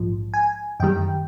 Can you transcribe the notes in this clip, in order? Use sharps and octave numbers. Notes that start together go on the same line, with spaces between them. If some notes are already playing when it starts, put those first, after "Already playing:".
Already playing: A#1 G#2 F3
G#5
F#2 D#3 G3 G5